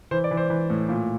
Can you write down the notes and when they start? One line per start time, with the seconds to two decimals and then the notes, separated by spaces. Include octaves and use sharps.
0.11 E3 C5
0.24 D5
0.31 E3
0.37 C5
0.50 E3
0.70 A2
0.89 A#2